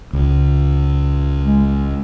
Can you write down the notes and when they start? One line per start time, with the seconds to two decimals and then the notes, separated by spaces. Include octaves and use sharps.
0.13 C#2
1.44 G#3